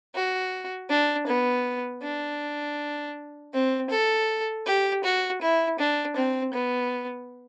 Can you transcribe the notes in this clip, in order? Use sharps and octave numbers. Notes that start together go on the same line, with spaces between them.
F#4
D4
B3
D4
C4
A4
G4
F#4
E4
D4
C4
B3